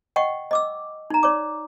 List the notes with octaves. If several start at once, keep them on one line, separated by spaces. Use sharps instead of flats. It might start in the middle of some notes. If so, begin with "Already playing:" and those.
D#5 F#5 G5 C#6
D#5 D6 E6
D#4 A#5
C#5 D5 D6